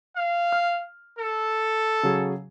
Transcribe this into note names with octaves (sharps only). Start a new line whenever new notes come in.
F5
F6
A4
C#3 F#3 G#4